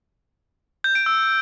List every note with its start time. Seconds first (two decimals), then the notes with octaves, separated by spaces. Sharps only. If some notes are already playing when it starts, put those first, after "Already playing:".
0.84 G6
0.95 D7
1.06 E6